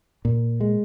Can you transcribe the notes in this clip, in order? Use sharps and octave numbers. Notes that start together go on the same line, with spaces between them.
A#2
G#3